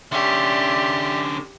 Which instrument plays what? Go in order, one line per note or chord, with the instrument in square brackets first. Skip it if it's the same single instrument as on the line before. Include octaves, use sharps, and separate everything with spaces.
[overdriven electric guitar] D3 C#4 [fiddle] G4 [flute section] D5 E5 C6